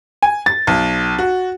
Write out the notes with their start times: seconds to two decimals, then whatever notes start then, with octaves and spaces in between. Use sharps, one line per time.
0.23 G#5
0.46 A6
0.67 B1
1.18 F#4